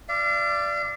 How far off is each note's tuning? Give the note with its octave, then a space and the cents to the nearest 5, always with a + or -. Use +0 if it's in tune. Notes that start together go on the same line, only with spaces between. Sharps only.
D5 +0 F5 -45